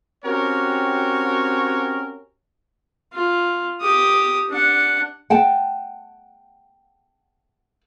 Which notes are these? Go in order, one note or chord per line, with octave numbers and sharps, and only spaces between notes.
C4 C#4 F#4 G4 A#4 C#5
F4
G4 D#6
D4 F#5
F#5 G5 A5